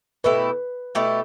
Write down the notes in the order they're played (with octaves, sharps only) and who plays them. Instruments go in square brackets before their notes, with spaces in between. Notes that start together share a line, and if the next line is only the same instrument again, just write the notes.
[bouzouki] B2 A3 E4 G4 [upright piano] B4
[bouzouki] B2 A3 E4 G4